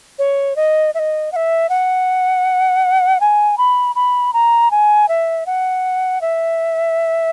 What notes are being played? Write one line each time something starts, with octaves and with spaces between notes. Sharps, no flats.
C#5
D#5
E5
D#5
F#5
E5
F#5
G#5
B5
B5
A#5
G#5
E5
F#5
E5